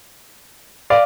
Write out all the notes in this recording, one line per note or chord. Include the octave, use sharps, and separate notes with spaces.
D5 F5